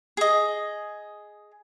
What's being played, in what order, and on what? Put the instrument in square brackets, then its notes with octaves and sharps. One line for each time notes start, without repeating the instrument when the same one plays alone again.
[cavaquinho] G#4 D#5